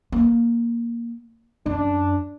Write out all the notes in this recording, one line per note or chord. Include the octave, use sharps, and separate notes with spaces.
A#3
F#2 D4